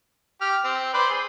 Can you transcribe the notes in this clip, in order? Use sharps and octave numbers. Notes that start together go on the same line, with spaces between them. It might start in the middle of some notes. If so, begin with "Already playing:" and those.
G4 F6
C4
B4 C5 D5
G#4